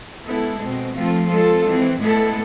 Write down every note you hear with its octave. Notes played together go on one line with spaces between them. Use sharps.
G#3 B3 E4 A4
B2 G#3 C4
F3 A3 C4 F4 A4
G#3 C4 F4 A4
E3 G#3 C4
A2 G#3 B3 E4 A4